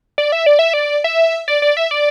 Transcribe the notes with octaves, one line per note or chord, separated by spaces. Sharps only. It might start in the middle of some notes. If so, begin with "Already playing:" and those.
D5
E5
D5
E5
D5
E5
D5
D5
E5
D5